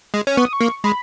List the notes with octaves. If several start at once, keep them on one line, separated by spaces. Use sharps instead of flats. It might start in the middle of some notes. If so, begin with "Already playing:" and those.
G#3
C#4
B3 C#6
D#6
C#6
A#3
G#3 B5